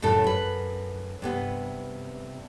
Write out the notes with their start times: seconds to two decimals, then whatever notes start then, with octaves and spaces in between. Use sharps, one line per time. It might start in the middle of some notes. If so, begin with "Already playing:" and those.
0.02 F#2 A2 C#3 A4
0.24 F#2 B4
1.22 G2 C3 B3